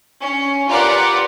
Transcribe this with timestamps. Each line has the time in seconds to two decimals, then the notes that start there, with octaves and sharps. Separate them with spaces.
0.21 C#4
0.69 F4 G4 A#4 B4 D5 F#5